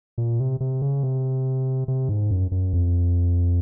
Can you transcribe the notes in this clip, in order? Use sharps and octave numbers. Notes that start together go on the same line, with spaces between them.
A#2
C3
C3
C#3
C3
C3
G#2
F#2
F#2
F2